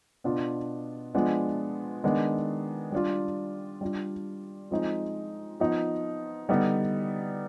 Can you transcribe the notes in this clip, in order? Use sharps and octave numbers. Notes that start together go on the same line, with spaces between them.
B2 B3 D4 F4
F3 G#3 B3 D4 F4
D#3 G#3 B3 D4
G3 D4 F4
G3 D4 F4
F3 G#3 C4 D#4
F3 B3 D#4
D3 G3 B3 D#4